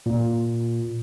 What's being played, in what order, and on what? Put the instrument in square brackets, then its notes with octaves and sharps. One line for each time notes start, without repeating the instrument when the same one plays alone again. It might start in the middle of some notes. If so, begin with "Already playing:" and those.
[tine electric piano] A#2